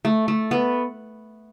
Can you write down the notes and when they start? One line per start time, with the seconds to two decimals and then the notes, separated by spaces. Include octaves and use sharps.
0.05 A3
0.28 A3
0.51 B3